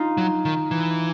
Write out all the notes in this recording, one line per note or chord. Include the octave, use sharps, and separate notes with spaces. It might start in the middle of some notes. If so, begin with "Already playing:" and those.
Already playing: D#4 F4
F#3
D#3
E3